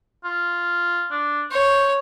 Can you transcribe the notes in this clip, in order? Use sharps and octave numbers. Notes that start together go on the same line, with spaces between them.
F4
D4
C5 C#5